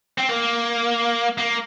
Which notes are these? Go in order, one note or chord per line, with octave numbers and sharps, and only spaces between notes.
C4
A#3
A#3